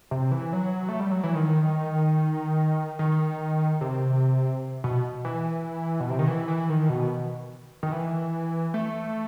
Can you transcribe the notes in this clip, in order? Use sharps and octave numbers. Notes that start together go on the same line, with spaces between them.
C3
E3
F#3
A3
G3
F#3
E3
D#3
D#3
C3
B2
E3
B2
C3
D#3
E3
E3
D#3
B2
D#3
E3
A3